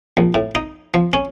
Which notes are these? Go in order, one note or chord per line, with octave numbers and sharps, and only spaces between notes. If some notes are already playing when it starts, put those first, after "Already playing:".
A#1
A2
D#4
F3
C#4